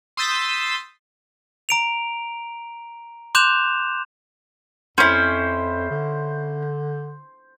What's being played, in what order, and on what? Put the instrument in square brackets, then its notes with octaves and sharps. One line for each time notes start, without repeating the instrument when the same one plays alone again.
[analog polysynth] C6 D#6 E6 G6 A6 B6
[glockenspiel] A#5 D7 F7
C6 D6 F#6 G6 E7 F7
[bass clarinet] F2 [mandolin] C#4 E4 [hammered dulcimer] C5
[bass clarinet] D3